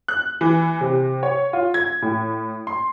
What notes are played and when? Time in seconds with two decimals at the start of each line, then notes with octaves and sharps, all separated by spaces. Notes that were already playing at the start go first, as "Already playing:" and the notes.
0.08 F#6
0.41 E3
0.81 C3
1.23 C#5
1.53 F4
1.74 G#6
2.02 A2
2.67 C6